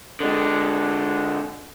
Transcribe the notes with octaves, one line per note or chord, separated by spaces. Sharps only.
D3 G#3